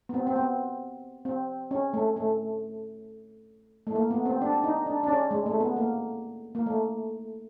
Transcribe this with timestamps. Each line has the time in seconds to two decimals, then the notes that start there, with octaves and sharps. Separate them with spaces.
0.09 B3
0.14 C4
0.27 C4
0.36 B3
1.25 C4
1.71 C#4
1.94 A3
2.16 A3
3.87 A3
3.95 A#3
4.11 B3
4.26 C4
4.41 D4
4.64 D#4
4.86 D4
5.03 D4
5.08 C#4
5.31 G#3
5.46 A3
5.60 B3
5.77 A#3
6.55 A#3
6.66 A3